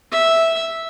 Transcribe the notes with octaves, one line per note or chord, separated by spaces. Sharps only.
E5